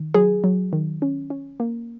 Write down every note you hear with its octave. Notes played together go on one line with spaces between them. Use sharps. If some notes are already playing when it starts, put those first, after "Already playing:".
Already playing: D#3
F#3 G#4
F#3
D#3
C#4
C#4
A#3